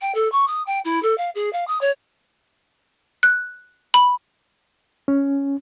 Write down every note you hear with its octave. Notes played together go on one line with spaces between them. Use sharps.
G5
A4
C#6
D#6
G5
E4
A4
F5
G#4
F5
D#6
C#5
F#6
B5
C#4